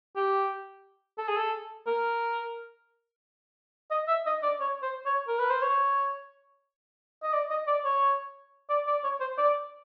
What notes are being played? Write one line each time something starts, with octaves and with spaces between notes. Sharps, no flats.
G4
A4
G#4
A4
A#4
D#5
E5
D#5
D5
C#5
C5
C#5
A#4
B4
C5
C#5
D#5
D5
D#5
D5
C#5
D5
D5
C#5
C5
D5